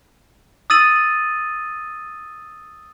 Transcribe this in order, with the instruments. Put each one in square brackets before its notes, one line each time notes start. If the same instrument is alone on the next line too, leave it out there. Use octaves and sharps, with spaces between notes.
[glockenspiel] D#6 E6 A6 D#7 F#7